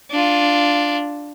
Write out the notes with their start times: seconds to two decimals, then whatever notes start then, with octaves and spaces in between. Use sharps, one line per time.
0.11 D4 F4